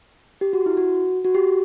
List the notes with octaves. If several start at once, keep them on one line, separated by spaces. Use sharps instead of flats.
G4
F#4
E4
F#4
F#4
G4